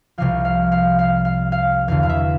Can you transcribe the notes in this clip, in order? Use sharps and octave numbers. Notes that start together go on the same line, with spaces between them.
C2 C3 F3 F5
F5
F5
F5
F5
F5
E1 E2 D3 F5
F5
E5